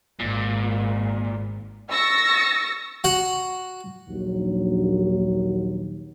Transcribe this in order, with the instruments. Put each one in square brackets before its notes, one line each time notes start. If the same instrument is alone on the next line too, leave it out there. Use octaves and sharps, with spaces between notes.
[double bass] G#1 [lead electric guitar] A#2
[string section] C#6 E6 A6 A#6 C#7
[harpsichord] F#4 F#5
[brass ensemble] A#1 D#2 F#3